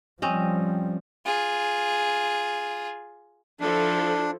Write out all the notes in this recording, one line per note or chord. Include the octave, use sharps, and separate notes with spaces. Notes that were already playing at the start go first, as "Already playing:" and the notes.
F3 G3 C4 C#4 D#5
F4 G#4
F3 D4 E4 A4